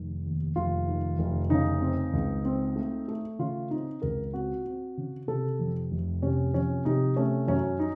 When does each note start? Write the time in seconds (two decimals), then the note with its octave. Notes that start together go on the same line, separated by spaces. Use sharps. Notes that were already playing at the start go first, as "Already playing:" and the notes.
Already playing: F1 D#3
0.25 D#2
0.56 F1 F4
0.88 D#3
1.19 F1
1.50 C#3 D#4
1.82 C4
2.13 C#2
2.45 C4
2.76 A3
3.08 A3
3.39 C#3 F4
3.71 C4 D#4
4.02 C#2 A#4
4.33 C4 F#4
4.65 C4
4.97 C#3
5.28 C3 A4
5.59 F2
5.91 F1
6.22 C3 C#4
6.54 F3 C#4
6.85 C3 D#4
7.16 A3 C#4
7.48 F#2 C#4
7.79 D#4